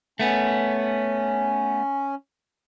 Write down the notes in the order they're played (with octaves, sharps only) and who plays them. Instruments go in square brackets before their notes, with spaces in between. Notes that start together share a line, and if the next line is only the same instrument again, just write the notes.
[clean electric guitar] A3 B3 [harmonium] C#4